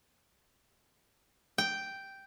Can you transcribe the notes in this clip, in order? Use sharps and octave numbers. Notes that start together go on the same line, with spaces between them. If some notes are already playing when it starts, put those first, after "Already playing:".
G5